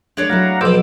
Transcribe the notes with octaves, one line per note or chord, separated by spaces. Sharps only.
G#3 A3 D4 C#5 D5
F#3 A3 E4 F5 F#5 A#5
B1 B2 F3 C5 D6 E6 G6